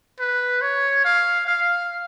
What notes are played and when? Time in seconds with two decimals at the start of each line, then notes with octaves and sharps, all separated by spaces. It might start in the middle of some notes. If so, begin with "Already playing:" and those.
0.19 B4
0.62 C#5
1.05 F5
1.47 F5